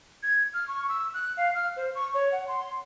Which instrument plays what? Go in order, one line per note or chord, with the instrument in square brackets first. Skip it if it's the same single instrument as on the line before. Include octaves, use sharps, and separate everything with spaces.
[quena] G#6
F6
C#6
E6
F#6
F5
F6
C5
C#6
C#5
F#5
C6